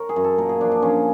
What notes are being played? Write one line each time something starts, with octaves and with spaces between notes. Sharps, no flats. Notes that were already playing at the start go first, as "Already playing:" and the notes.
Already playing: A#4 C#5
G#4
F#2
A4
A#2 A#4
G#4
F3 D4
D4
F3 C#4